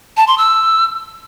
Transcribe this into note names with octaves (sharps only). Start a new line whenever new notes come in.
A5
C6
E6